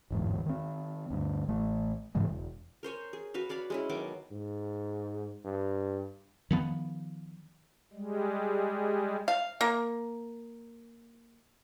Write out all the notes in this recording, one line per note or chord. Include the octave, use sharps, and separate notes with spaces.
G1 E2 G#2
D#3 C4
D2 G2
A1 A3
G#2 C#3 E3 G#3
E1
A#4 C5 C#5 G#5
G#4
F#4 B4 F5
C#5 D5 F5 B5
G#3 C#4 E4
B2 D#3 F#3 D6
G#2
G2
D#3 F3 B3
G3 G#3
F5
A#3